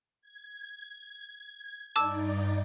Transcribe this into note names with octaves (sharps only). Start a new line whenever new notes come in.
G#6
G2 D#4 D5 A5 D6 E6